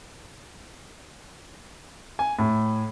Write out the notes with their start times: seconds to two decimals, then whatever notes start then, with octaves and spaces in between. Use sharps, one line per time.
2.19 G#5
2.39 A2